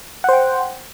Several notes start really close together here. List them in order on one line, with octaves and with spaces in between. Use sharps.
F#5 C5 G5